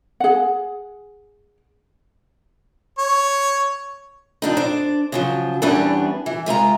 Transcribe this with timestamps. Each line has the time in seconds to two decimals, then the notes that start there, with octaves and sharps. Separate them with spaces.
0.20 G#4 F#5
2.99 C#5
4.42 F2 D4 D#4
4.57 D4 C5
5.12 C#3 F3 F#3
5.62 E2 E3 G3 B3 C#4 D4
6.26 E3
6.46 C3 G#3 F4 A#5